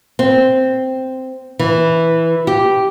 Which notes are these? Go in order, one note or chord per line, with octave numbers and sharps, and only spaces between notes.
C4
E3
G4